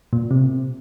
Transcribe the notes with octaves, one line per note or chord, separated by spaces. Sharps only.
A#2
C3